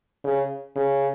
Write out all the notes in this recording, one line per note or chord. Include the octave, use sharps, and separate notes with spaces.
C#3
C#3